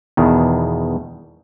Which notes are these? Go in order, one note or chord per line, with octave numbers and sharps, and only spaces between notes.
E2 B2 D#3